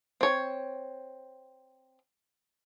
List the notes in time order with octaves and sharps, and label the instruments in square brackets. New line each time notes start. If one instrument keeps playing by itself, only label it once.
[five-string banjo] C4 C#5